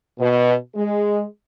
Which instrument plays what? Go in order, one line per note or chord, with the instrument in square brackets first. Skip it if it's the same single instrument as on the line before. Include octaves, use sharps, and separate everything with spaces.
[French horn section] B2
G#3